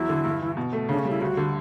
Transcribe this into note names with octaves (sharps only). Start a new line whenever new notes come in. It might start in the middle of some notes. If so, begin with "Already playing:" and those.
Already playing: E2 F#3 E4
D3
G2
E3
B2
A3
C#3 D4
C#4
G3
E4
D2 F#4
D3